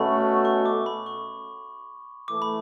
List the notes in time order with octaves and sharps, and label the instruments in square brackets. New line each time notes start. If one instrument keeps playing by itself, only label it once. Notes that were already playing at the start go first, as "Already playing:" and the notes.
Already playing: [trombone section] B2 A3 C#4 F#4 [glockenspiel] B5
[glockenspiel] C#6
D6
B5
C#6
[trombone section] E3 A3 [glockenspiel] D6
[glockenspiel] B5